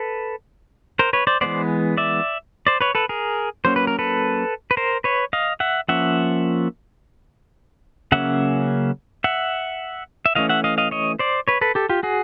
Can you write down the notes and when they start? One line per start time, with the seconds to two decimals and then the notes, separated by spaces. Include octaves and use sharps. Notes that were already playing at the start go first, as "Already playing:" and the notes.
Already playing: A4 B4
0.99 A#4 C5
1.13 B4 C#5
1.27 C5 D5
1.41 E3 G#3 B3 C5 D5
1.97 D5 E5
2.67 C5 D5
2.81 B4 C#5
2.95 A4 B4
3.09 G#4 A#4
3.65 F#3 A#3 C#4 C5
3.76 B4
3.87 A#4
3.99 A4 B4
4.71 B4
4.77 A#4 C5
5.04 B4 C#5
5.33 D#5 F5
5.60 E5 F#5
5.89 F3 A#3 C#4 E5 F#5
8.12 C#3 F#3 A#3 C#4 E5 F#5
9.24 E5 F#5
10.26 E5
10.35 E3 A3 C#4 D#5 F5
10.49 E5 F#5
10.64 D#5 F5
10.78 D#5 F5
10.91 C#5 D#5
11.19 C5 D5
11.48 B4 C#5
11.61 A4 B4
11.75 G4 A4
11.89 F4 G4
12.03 F#4 G#4